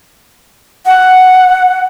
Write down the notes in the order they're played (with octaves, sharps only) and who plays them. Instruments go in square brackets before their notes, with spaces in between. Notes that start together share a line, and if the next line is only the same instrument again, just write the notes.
[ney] F#5